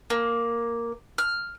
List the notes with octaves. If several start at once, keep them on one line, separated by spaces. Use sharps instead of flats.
A#3
F6